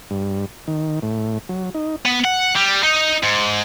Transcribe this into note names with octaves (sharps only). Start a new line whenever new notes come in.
G2
D#3
A2
F#3
D#4
B3
F#5
G3
D#4
G#2